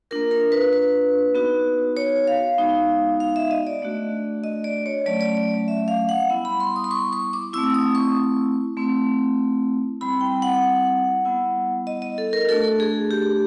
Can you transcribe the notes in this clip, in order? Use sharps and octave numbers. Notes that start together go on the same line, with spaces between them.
A#3 D4 F4 A#4
A#4
B4
B4
B3 D#4 F#4
C#5
F5
G#3 B3 D#4 F#4
F5
E5
D#5
D5
A3 D4 F#4
D#5
D5
C#5
F#3 A3 C#4 D5
D5
D5
E5
F5
F#5
G3 B3 E4
B5
C6
D#6
C6
C#6
C#6
D6
A3 C4 E4 E6
D#6
C#6
A3 C4 E4
G3 C4 E4 B5
G5
F#5
G3 B3 E4
D#5
D#5
A4
A#4
A3 D4 F#4 A4
G#4
G4